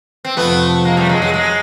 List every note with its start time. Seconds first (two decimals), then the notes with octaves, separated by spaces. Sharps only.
0.25 C4
0.37 F2 C3 F3 A3 B3
0.85 G#3 A#3
0.97 G3 A3
1.09 F#3 G#3
1.22 F#3 G#3
1.33 F#3 G#3